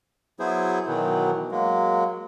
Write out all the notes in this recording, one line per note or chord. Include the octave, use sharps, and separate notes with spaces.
F#3 B3 E4 G#4 C5
B2 D#3 E3 F#3
F#3 G#3 A#3